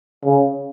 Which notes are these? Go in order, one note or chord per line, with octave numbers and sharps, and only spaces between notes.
C#3